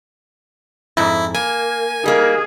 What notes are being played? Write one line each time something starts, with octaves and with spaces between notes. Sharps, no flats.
F2 G#2 E4
A#3 G#5
D#3 G3 A#3 G#4 A#4